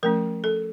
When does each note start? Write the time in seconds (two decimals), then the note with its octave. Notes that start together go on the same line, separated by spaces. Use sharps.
0.03 F3 A3 C#4 A#4
0.44 A4